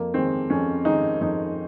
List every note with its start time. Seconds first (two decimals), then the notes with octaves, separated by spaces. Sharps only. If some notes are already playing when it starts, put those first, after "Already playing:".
Already playing: F2 A#3
0.14 D#3 G#3 C4
0.50 F2 C#4
0.85 D#3 G#3 D#4
1.21 F2 D#4